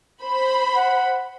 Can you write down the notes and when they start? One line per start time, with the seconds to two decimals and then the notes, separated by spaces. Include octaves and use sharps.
0.22 C5 B5
0.74 F#5